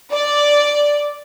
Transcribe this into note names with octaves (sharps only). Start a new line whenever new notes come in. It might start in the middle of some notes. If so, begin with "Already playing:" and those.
D5